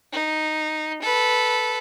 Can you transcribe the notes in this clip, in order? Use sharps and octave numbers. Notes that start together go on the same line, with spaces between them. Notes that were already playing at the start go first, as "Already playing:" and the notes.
D#4
A4 B4